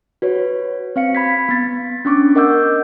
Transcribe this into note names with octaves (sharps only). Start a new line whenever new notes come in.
F#4 B4 C#5
C4 F5 C#7
B5 G#6 B6
B3 A6
C#4 D4 C#6 D6
A#4 D#5 F#5 D6 E6 G6